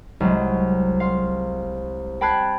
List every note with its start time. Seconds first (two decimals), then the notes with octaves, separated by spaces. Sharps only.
0.20 C2 F#3 G#3
1.00 F5 C6
2.21 G5 A5 B5 F#6 G#6 C7